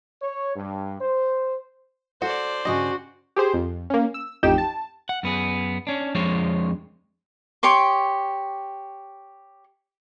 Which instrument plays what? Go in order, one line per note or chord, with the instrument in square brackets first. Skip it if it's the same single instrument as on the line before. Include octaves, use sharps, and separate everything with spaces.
[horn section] C#5
G2
C5
[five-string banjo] F#4 [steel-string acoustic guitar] A4 [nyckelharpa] C5 D5
[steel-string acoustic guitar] G2 A#2 C#3 [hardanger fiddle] F#4 [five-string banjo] D#5
[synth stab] G4 G#4 C5
F2
A#3 C#4
E6
A1 F2 D#4 G4 G5 E7
A5
[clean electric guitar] F#5
F#2 B3 G#4
C#4 D4
F2 F3 G#3 D4 C5 C#5
[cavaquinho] G4 C#5 C6 D6